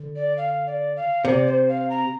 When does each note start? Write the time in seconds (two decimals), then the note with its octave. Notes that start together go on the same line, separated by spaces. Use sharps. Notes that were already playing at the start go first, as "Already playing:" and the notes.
Already playing: D3
0.16 D5
0.37 F5
0.67 D5
0.96 F5
1.25 C3 D5
1.47 C5
1.69 F5
1.90 A#5